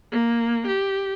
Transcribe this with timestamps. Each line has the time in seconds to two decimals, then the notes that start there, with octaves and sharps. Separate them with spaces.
0.12 A#3
0.67 G4